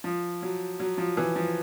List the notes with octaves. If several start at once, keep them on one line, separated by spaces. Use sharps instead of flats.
F3
F#3
F#3
F3
E3
F3